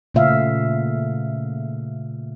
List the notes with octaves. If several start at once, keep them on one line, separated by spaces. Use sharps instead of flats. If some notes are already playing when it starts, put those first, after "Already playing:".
A#2 C#3 A3 F4 E5 F5